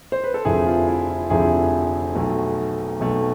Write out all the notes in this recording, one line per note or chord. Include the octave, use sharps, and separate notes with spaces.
C5
B4
A4
F1 F2 D3 F3 E4 G#4
F4
E4
F4
F1 F2 D3 F3 E4 G#4
B1 B2 A3
B1 B2 A3